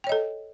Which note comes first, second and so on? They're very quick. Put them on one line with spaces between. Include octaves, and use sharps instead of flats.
G5 C#5 D#5 A4